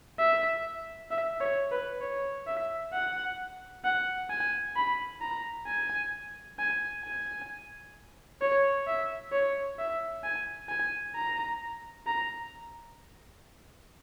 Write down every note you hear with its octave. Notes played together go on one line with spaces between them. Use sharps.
E5
E5
C#5
B4
C#5
E5
F#5
F#5
G#5
B5
A#5
G#5
G#5
G#5
C#5
E5
C#5
E5
G#5
G#5
A#5
A#5